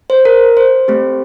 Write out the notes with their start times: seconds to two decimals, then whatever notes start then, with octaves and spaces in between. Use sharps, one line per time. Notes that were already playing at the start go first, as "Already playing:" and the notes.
0.10 C5
0.25 A#4
0.57 C5
0.88 A3 C4 G4